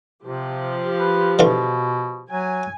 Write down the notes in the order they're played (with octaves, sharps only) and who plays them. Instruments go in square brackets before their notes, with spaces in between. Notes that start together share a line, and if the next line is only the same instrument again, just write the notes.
[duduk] C3 [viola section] F3 G4
[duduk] B4
[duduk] B2 [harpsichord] D3 E3 F4
[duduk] F#3 [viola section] G#5